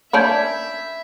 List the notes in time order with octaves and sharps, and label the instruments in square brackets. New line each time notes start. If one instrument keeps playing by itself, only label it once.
[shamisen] A#3 C#4 D4 [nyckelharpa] E5 [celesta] B5 G6 G#6